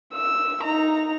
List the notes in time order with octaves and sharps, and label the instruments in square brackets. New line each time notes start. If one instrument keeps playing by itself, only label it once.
[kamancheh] E6
D#4 A#5